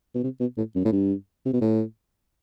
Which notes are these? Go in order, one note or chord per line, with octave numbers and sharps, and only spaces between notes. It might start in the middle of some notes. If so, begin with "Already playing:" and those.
B2
C3
B2
A2
F#2
A2
G2
C3
B2
A2